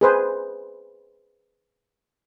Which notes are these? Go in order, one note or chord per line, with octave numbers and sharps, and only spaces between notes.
G#4 B4 C5